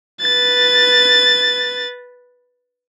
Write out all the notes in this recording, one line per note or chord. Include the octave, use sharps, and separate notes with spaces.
B4 A6